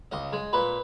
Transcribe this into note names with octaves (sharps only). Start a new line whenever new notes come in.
C#2 D#5
G#3
A#2 B4